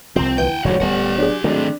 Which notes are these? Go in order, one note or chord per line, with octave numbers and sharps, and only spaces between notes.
C2 C3 F3 C4 G6
D2 E3 F#5 G5 G6
F1 E2 G#2 D3 F3 F#4 C#5
D1 G3 B3 G4 F#5
F#3 D4 G#4
D#2 D#3 F#3 G#3 A3 C4 D4